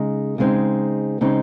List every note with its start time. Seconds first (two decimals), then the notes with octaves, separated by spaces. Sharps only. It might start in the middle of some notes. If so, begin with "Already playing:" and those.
Already playing: C#3 G#3 D#4
0.38 C#3 G#3 C4 D#4
1.21 C#3 G#3 C4 D#4